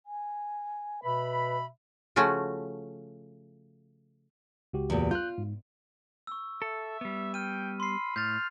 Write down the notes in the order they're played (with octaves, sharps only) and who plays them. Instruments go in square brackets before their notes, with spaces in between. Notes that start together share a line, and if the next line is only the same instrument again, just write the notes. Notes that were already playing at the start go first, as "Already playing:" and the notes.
[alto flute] G#5
[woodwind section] B2 E5 B5 [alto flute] B4
[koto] C#3 F3 A3 C#4 F#4
[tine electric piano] C#2 F#4 G4
[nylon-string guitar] E2 A#2
[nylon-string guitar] F4 [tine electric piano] F#6 G6
[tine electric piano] G#2
[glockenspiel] C#6 E6
[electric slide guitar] A4 [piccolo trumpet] E5
[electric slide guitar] G3 B3
[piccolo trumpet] G5 [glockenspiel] F6 D#7
[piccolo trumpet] B5 [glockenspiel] C6 C7
[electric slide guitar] A2 [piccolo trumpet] F6 [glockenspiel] G6 A6